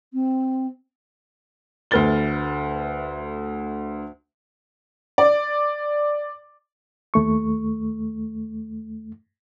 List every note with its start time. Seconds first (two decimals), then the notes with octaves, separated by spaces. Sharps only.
0.13 C4
1.91 D2 A3 B4 F6 A6 G7
5.18 D5
7.14 D#2 A3 C#6